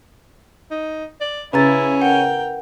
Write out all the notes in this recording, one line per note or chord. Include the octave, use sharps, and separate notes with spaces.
D#4
D5
C#3 C#4 E4 B4 A#5 A6
A#4 F#5 G5